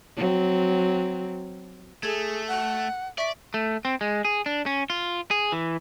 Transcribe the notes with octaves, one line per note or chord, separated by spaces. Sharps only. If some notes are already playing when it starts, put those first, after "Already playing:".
F#3 C4
A3 G#4 A4 G#6
F#5
D5 E5 C#6 B6
A3
C4
G#3
G#4
D4
C#4
F4
G#4
E3